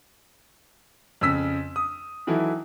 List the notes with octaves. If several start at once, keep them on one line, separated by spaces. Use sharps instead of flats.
F2 C#3 E6 B6
D#6
D#3 E3 F#3 E4 A4